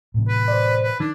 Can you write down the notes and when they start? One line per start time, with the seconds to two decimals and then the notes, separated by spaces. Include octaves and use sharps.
0.14 A2 C3 E3
0.28 B4
0.48 C5 D5
0.82 B4
1.00 D#3 D4